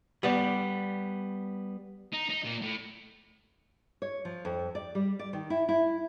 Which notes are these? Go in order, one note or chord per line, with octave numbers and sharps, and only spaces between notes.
G3 B3 D5
D#4
D#4
A#2
A2
C#5
F3
F2
D5
G3
D5
D#3
E4
E4